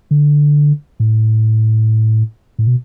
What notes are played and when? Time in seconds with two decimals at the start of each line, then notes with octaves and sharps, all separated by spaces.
0.11 D3
1.00 A2
2.59 A2
2.67 B2